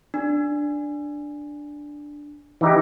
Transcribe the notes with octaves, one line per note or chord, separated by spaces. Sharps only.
D4
E3 D#4 G4